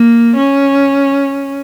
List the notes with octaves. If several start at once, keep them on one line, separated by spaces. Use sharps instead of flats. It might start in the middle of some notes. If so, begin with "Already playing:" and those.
Already playing: A#3
C#4